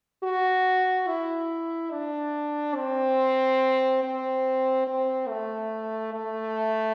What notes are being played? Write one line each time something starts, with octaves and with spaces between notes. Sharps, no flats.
F#4
E4
D4
C4
C4
C4
A3
A3